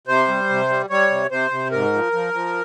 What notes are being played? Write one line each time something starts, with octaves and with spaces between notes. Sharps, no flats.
C3 C5
G3
C3
G3
G3 C#5
C3
C3 C5
C3
G#2 A#4
F3
F3
F3